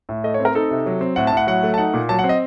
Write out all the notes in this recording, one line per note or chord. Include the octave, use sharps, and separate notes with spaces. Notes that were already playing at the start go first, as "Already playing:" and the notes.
A2
A3 D#5
C#5
C4
A#4
D#4 A4
C3
F#3
C4
A2 F#5
A5
A2 F#5
F#3 F#5
A3
A5
D#4 F#5
A#2
F#3 A5
F#5
C4
D#5